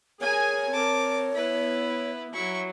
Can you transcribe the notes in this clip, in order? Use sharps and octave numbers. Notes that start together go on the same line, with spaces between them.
G#4 A#4 C#5 G#5
C4 A#4 A5 D6
B3 E4 B4
F#3 E4 C#6